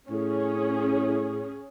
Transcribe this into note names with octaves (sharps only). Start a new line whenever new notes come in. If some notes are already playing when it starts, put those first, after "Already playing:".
A2 C#4 G#4